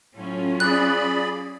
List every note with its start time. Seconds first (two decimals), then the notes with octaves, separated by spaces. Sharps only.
0.15 A2 F#3 C#4 F4
0.60 G#4 D5 B5 F#6